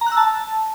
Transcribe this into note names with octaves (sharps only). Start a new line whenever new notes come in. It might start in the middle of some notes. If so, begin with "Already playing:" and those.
A#5
F#6
E6
A5